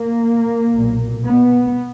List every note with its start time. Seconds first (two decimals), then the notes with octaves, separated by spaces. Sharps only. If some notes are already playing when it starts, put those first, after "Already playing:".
Already playing: A#3
0.72 B1 A#2
1.24 B3